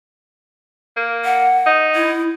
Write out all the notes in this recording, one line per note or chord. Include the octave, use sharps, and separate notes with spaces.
A#3
F#5
D#4
E4